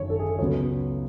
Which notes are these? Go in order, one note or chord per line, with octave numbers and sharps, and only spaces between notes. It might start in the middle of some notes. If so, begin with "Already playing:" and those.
Already playing: G#1 F#2 D3 C#5
A4
G#4
A4
C#2 C#3 F#3 B3 C#5